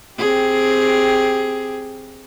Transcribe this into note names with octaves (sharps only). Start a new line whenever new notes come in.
C4 G4 G#4